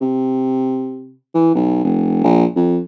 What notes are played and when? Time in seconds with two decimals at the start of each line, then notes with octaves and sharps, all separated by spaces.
0.01 C3
1.35 E3
1.55 B1
1.84 F1
2.24 A#1
2.56 F2